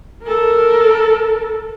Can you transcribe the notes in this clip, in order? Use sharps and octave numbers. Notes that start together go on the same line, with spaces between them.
A4 A#4